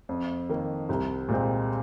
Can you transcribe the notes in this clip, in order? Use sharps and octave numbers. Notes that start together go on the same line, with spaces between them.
F2
D#3 A#3
C2
A#2 G#3 C4